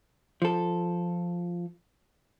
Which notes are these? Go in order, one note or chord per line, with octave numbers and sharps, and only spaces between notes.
F3 A4